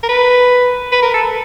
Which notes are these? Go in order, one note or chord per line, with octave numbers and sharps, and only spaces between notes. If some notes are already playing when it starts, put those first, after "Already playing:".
A#4
B4
B4
A#4
A4